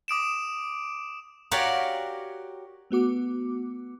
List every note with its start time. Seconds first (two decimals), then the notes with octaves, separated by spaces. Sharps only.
0.08 D6 D#6 D7 E7
1.51 F#4 G4 A#4 C#5 D5 F5
2.91 A3 B3 F#4 D6